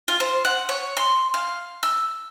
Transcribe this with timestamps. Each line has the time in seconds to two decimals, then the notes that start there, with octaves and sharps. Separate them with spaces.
0.08 F4
0.20 C5
0.45 F#5
0.69 C#5
0.97 C6
1.34 F5
1.83 E6